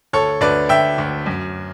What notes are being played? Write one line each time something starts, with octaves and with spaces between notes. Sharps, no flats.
D2 A4 C#5
D2 B4 D5
D2 E5 G5
D2
F#2